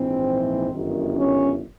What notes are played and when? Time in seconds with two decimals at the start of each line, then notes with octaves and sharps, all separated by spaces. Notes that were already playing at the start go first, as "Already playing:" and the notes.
Already playing: A#1 G#2 E3 C4
0.69 G1 F#2 D#3
1.17 C#4